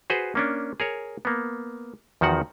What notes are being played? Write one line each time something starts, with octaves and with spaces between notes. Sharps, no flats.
F#4 G#4 B4 C5
A#3 C#4 D4
G#4 A#4 C#5
A#3 B3
E2 D#3 F3 F#4 F#5